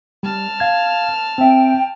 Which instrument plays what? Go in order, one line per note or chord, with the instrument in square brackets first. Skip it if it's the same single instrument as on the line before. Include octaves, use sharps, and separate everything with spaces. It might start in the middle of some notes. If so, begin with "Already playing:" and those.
[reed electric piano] G3 [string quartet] A5 F6
[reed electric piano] F5 G#6
[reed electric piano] C4 E5 [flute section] G5